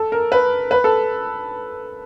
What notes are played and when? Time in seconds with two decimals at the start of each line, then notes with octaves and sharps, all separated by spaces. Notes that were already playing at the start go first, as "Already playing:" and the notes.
Already playing: A4
0.12 A#4
0.32 B4
0.71 B4
0.84 A4